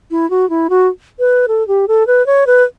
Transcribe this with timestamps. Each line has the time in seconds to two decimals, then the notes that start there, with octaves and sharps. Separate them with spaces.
0.11 E4
0.30 F#4
0.50 E4
0.70 F#4
1.19 B4
1.48 A4
1.68 G4
1.88 A4
2.07 B4
2.27 C#5
2.47 B4